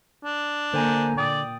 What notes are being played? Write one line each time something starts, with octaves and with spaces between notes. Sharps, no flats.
D4
D3 A#3 C5 G#5 A#5
A#2 D5 G5 D#6